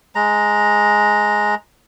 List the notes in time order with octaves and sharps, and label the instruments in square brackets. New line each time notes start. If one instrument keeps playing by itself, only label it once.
[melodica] G#3 A#5